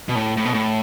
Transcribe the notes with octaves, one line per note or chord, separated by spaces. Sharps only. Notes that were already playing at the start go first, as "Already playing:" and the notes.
B2
A2
A2
B2
A2